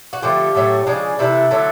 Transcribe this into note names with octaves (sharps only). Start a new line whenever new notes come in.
F#4
D3 F3 A3 G4
A2 F#3 A3
C#3 F3 G#3 D4
C3 E3 A3 E4
D3 F#3 A3